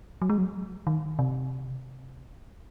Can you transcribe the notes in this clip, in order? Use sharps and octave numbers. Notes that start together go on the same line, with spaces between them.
F#3
G#3
F#3
D#3
C3